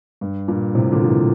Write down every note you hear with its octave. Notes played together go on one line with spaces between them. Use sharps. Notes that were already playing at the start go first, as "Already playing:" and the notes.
G2
G2 A#2
A2 C3
A#2 D3
F3
C3 E3